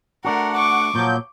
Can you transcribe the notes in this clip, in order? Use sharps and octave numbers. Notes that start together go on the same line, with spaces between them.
A3 D4 F#4 A#4 F#5
C#6 D6
A#2 F3 F#3 G6